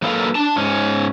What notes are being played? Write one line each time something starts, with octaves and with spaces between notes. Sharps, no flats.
F#3 A#3 E4 A4 B4 F5
D4 A5
G#2 C#4